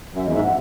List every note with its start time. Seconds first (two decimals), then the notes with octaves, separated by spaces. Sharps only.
0.15 F#2 E5
0.25 E2 D#5
0.34 G#2 E5
0.43 F#5